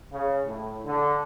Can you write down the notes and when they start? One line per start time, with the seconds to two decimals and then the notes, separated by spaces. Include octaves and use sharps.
0.12 C#3
0.46 A2
0.84 D3